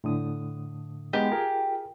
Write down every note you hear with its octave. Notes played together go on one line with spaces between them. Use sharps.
A2 D3 D#6
G#3 B3 D#4 G4
F4 G#4 A#4